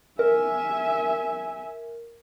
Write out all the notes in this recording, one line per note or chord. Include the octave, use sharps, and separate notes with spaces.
A#4 E5 G#5